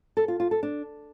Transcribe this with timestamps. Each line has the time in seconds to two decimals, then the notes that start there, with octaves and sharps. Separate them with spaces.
0.17 A4
0.28 F4
0.40 F4
0.51 A4
0.63 D4